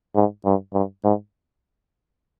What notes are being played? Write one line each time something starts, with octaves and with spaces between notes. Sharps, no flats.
G#2
G2
G2
G#2